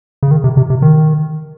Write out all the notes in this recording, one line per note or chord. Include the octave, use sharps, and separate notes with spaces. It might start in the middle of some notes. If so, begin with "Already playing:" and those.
C#3
D#3
C3
C3
C3
D#3